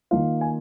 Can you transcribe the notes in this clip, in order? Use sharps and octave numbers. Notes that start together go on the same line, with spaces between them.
D#3 A#3 F4 F5
G#5